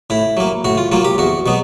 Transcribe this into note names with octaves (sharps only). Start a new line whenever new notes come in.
A2 E4
F#3 A#3
A2 F#4
F4
F#3 A#3 F4
G4
E2 F#4
B2 F#3 B3